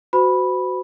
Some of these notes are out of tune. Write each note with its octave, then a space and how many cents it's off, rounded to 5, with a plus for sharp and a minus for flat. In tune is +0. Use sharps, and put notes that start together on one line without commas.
F#4 +0 C5 -40 B5 -5